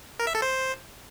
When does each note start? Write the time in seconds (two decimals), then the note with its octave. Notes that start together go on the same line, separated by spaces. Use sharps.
0.20 A#4
0.27 E5
0.35 A4
0.42 C5